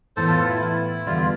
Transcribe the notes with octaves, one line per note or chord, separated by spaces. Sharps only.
A2 E3 B3 A4 C5
F4 A4
F4
E4
E4
E2 D3 G3 B3 D4 F4
F4